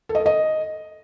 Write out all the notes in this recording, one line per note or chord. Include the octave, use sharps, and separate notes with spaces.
A4
D#5
A4
D#5